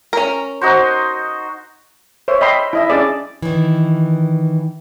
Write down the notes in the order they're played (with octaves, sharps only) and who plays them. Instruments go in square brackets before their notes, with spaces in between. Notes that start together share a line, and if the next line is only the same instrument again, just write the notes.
[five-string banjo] C#4 A#4
[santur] D#4 F#4 C5
[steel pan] C5 C#5 E5
D#5 E5 G5 B5 C6
E4 D#5 E5
C#4 D4 G#4 D5
[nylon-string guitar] D#3 E3